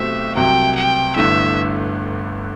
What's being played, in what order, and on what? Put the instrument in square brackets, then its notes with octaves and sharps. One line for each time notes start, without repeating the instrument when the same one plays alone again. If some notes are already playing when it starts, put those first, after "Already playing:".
Already playing: [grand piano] B1 B2 A3 C4 G4 [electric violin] E5
[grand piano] C2 C3 F#3 [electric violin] G5
[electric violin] G5
[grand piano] G1 G2 D3 A3 E4 [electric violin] E5